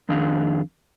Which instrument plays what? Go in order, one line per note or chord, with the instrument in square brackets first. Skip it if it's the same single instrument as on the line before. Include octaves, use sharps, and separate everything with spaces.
[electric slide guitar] F2 D#3 D4 G#4 F5